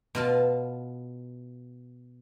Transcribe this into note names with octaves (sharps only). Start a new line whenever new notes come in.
B2 F4 A5